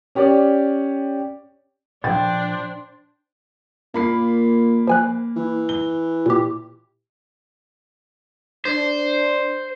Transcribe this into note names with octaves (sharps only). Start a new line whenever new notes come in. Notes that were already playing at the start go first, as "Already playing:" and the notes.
C#4 G4 C#5 D5
A#2 F3 D4 C5 G5 A6
A#2 A#3 B5 C7
F3 G#5 F#6
E3
G7
A#2 G4
D4 C5